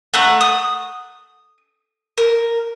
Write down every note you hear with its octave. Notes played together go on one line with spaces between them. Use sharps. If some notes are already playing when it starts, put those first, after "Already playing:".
A3 F#5 A#5
D#6
A#4